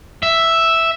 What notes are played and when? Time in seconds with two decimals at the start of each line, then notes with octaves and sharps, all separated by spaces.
0.23 E5